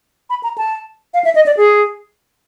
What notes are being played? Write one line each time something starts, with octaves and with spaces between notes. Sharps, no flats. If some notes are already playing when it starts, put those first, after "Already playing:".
B5
A#5
A5
F5
E5
D#5
D5
G#4